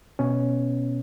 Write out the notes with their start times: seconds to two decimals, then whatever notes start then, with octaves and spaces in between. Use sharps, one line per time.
0.19 B2 B3 C#4